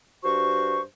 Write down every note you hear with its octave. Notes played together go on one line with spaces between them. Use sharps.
G2 F#4 C5 C#6